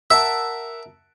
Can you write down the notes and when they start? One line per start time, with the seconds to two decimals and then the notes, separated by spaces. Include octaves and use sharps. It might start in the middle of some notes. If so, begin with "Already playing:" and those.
0.11 A#4 E5 F#5 A5